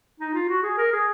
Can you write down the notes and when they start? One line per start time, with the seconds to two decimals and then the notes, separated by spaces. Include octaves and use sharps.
0.20 D#4
0.34 F4
0.49 F#4
0.63 G#4
0.77 A#4
0.92 G#4